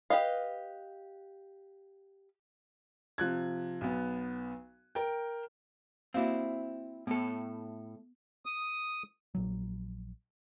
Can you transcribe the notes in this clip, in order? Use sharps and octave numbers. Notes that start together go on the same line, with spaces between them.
G4 B4 D#5 F5
C3 F3 F#6 G#6
B1 B3
A#4 G5
A#3 C4 E4 F#4 F5
A2 B3 A4
D#6
A#1 F#3